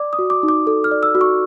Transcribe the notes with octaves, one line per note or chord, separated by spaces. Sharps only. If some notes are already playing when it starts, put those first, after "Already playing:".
Already playing: D5 D6
D#6
F#4
D6
D#4
D6
A4
F6
D5
E6
F#4
C#6